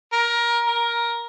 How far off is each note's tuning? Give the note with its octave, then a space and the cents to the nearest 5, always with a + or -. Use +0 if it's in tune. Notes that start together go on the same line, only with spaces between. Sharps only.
A#4 +20
A#4 +10